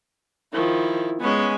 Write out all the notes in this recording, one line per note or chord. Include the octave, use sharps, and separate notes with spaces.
D#3 F3 E4
G#3 B3 C#4 G#5